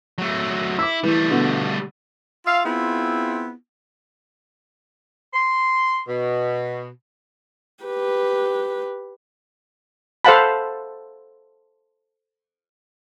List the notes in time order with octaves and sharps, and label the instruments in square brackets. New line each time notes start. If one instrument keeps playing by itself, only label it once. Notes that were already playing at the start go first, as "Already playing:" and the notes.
[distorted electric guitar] F#3 A3
[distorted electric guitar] E4 [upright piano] D6 E6
[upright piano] E3 [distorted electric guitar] G3 A3
[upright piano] B2 D3
[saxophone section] F4 E5 F5
B3 C4 E4 F4 G#4
[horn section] C6
B2
[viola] G4 B4
[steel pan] A4 C5 F5 F#5 A5 B5